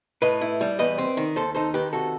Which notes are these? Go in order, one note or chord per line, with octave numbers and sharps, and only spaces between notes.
A2 B4 D#5
E4
G3
E2 B4 D#5
C4
D#3
D#2 A4 C5
D#4 A4 C5
D#3 G4 B4
C3 F#4 A4